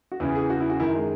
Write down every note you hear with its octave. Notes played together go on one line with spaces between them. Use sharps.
F#4
E2 C#3 E3 E4
G#4
F#4
E4
F#4
F#2 D#3 E4
G#3